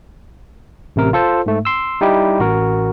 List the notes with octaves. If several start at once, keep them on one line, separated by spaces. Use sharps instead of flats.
A1 C3 A#4
F4 A4 C5
G#2 A3
C6 E6
G3 D#4 E4 G4
A1 F#4 A#4